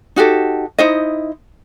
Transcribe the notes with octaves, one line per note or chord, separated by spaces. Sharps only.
D#4 F#4 G4 A4
D#4 E4 C5 D#5